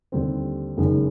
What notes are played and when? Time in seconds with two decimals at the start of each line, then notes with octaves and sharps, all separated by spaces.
0.12 D#2 D3 G3 C4
0.77 F#1 F#2 D#3 G#3